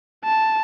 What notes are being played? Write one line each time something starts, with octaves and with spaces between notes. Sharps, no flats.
A5